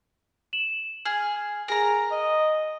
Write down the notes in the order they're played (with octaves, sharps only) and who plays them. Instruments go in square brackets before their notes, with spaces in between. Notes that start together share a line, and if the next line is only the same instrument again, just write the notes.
[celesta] E7 F#7
[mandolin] G#4 [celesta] F6
[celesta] G#4 G#5 [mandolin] A#4 A#5
[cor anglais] D#5 [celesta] D#6